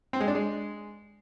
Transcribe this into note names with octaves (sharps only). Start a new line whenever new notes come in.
C4
G#3
D4
G#3